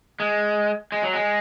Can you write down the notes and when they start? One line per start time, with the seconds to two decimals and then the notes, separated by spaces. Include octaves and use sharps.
0.20 G#3
0.92 G#3
1.03 F#3
1.14 G#3